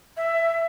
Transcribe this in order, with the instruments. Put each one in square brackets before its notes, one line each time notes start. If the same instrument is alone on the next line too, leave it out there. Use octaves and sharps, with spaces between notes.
[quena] E5